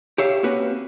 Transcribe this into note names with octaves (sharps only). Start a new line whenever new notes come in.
G4 C#5 E5 F5
A#3 C4 C#4 F#4 B4